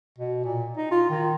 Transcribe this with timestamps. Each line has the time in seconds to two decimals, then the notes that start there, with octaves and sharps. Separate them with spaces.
0.18 B2
0.44 A#2
0.77 D#4
0.91 F4
1.10 D#3